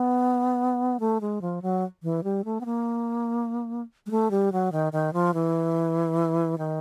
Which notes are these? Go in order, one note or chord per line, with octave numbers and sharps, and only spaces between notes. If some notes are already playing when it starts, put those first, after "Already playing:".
Already playing: B3
A3
G#3
F3
F#3
E3
G3
A3
B3
A#3
G#3
A3
G3
F#3
D#3
D#3
F3
E3
D#3